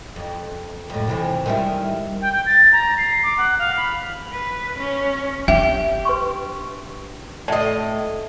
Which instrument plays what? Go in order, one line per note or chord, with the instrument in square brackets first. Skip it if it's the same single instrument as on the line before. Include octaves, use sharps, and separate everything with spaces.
[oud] F2
F2 A2
C3 E3 F3
D#3 G3 E4
[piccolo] G5
G5
A6
A#5
C7
D6
F#5
F5
B5
[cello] B4
C#4
[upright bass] D4 [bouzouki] G4 [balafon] E5
[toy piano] B4 C6 C#6
[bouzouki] A2 D#5 [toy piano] D5 A5